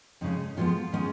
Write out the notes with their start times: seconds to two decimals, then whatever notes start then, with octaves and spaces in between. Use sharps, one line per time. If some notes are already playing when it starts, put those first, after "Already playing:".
0.21 F2 C#3 G#3 D#4
0.57 F2 F3 G#3 B3 C#4 F4
0.93 D#3 G#3 B3 C#4